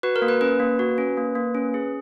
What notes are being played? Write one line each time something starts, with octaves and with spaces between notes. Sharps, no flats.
F#4 B4
A#4
A#3
B4
C#4 B4
A#3
F#4
C#4
A#3
A#3
C#4
G#4